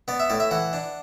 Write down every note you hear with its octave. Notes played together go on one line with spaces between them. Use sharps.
B3 D5
E5
A2 D5
E5
E3 F#5
D4